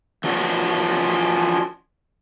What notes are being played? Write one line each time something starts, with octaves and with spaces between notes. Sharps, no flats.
E3 F3 C#4 F#4 A#4 D5